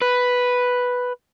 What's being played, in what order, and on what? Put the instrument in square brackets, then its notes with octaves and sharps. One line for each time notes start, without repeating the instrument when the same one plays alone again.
[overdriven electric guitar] B4